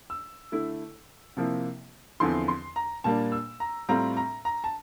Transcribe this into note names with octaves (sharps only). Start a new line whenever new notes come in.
E6
D3 A3 E4
C3 F3 A#3 E4
E2 D3 F3 C4 E4 C6
C6
A#5
A#2 G3 A#3 D4 A5
E6
A#5
A2 G3 C4 F4 A#5
A#5
A#5
A5